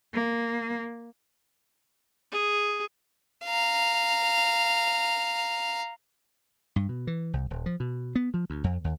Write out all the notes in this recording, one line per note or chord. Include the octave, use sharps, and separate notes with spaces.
A#3
G#4
F5 A#5
G2
B2
E3
C2
D#1
F3
B2
B3
F3
D2
F2
D#2